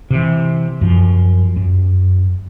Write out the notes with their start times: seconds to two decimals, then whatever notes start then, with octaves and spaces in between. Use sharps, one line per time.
0.10 C3 E3
0.81 F#2 F3
1.56 F#2